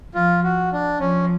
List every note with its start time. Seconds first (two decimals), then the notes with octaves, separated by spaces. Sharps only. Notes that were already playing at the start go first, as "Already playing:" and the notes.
0.15 F3 F4
0.44 F#4
0.73 D4
1.00 F3 C#4